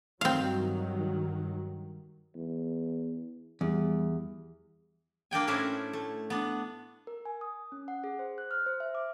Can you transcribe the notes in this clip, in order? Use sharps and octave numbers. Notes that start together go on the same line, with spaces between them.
G2 D#3 F#3 C4 F5
E2
E2 G3
A#3 D4 G5 G#5
A2 C#4 D4 E4 A#4 C5
A3
B3 D4
A#4
G#5
D#6
C#4
F#5
G#4
C5
F#6
F6
C5
E5
D6